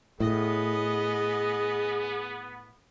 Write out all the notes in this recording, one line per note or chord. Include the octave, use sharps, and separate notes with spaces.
A2 B3 G#4 D#5